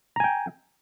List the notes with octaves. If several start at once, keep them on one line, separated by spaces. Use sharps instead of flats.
G5 G#5 A#5